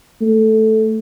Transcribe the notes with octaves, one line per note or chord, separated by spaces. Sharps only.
A3